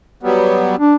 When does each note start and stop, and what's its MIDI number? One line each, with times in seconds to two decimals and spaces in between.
0.23 0.76 54
0.23 0.76 55
0.23 0.76 59
0.80 0.95 62